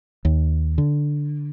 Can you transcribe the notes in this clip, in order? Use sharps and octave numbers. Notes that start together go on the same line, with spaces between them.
D#2
D3